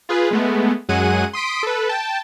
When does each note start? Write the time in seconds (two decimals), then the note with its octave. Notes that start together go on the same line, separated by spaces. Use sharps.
0.09 F4 G#4 B4
0.31 G#3 A3 B3
0.89 F#2 F#3 G#3 F#5 G#5 D#7
1.33 C6 D#6 B6 D7
1.63 A4 B4
1.89 G5 A5